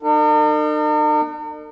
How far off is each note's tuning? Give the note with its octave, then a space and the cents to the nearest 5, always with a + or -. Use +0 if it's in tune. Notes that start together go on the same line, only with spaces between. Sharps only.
D#4 -45 A#4 -45